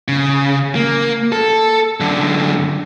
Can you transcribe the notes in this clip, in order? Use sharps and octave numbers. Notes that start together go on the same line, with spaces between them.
C#3
A#3
A4
F#2 D3